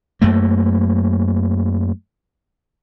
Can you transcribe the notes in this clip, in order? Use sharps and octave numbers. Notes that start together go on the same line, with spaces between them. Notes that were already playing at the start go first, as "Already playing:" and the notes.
F#2 A3 A#3